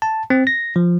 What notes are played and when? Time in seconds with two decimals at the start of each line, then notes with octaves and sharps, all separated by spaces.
0.02 A5
0.30 C4
0.47 A#6
0.76 F3